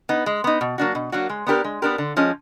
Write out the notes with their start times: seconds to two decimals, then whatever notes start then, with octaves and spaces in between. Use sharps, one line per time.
0.09 B3 D#4
0.26 G#3
0.44 B3 D#4
0.61 B2
0.78 F#3 A#3 D4 F#4
0.95 B2
1.12 F#3 A#3 D4 F#4
1.30 G#3
1.47 B3 D4 G4 A#4
1.64 G#3
1.82 B3 D4 G4 A#4
1.98 D3
2.17 F3 G#3 C#4